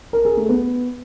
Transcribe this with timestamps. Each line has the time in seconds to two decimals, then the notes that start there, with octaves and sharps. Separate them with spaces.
0.13 A#4
0.25 G#4
0.37 A3
0.49 B3